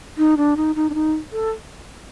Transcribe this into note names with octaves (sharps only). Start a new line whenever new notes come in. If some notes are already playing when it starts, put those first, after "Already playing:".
D#4
D4
D#4
D#4
D4
D#4
A4